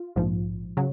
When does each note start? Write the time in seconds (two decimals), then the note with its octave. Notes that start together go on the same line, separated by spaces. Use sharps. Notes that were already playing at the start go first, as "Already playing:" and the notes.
Already playing: F4
0.16 A#1 G#2 F3
0.77 C#3 F#3